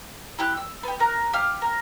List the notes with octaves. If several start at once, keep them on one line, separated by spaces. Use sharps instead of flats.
E4 G4 F#6
E6
B3 G4
A#4 F#6
G4 F5 F6
A#4